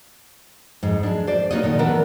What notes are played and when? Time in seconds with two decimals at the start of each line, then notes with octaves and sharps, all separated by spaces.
0.83 F2 G#2
1.03 G#3 D4
1.27 C5 D5
1.51 A#3 D#4 F#4 B4 C#5 D#5
1.63 A#2 D3 D#3
1.79 E3 B3 D4 A#4